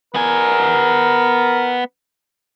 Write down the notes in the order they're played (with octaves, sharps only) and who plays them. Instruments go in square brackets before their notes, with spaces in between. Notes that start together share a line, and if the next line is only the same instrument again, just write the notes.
[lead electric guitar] B3 G#5 [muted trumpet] A#4